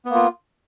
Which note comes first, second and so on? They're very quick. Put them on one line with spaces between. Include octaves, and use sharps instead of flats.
B3 A#3 F4